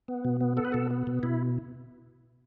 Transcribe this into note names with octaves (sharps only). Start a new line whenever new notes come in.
B3
B2
B3
B3 A4
B4
B2 A4
B3
B2
B2 E4